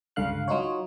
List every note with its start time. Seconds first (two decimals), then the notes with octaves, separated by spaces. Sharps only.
0.16 C#2 G2 D3 F5 F#6
0.48 F#3 D#4 F4 C#5